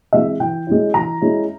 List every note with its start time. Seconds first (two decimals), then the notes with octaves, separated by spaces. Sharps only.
0.13 E3 G#3 C4 E4 E5
0.40 E3 G5
0.67 G#3 C#4 E4
0.94 E3 A#5
1.22 G#3 C#4 E4